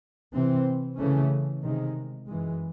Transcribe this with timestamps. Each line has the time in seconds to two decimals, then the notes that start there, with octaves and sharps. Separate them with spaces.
0.33 C3 E3 C4
0.99 C#3 E3 A3 C#4
1.63 C3 D#3 G#3
2.27 F#2 E3 G#3